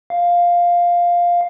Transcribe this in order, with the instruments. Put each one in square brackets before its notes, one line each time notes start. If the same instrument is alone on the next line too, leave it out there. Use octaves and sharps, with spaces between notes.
[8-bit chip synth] F5